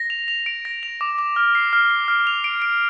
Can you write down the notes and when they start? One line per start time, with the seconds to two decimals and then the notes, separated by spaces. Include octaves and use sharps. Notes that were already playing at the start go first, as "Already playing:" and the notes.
Already playing: A#6
0.10 F7
0.28 F7
0.46 D7
0.65 A#6
0.83 F7
1.01 D6
1.18 D6
1.36 F6
1.55 C7
1.73 F6
1.90 C7
2.08 F6
2.27 F7
2.44 D7
2.62 D7